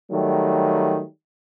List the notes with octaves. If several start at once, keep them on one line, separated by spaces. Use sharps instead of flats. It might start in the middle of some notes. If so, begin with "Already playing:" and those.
D#3 F#3 G3 A3